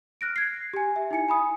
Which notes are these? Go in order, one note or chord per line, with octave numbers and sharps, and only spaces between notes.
F6 F#6 A#6 D7
G#6 C7
G4 G#5
E5
D#4 E4 G#5 C#7
G#5 B5 D#6